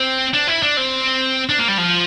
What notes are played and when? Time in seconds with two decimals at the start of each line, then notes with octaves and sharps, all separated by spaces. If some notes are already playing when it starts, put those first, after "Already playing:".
Already playing: C4
0.34 D4
0.48 E4
0.63 D4
0.77 C4
1.49 D4
1.59 A#3
1.68 G3
1.78 F3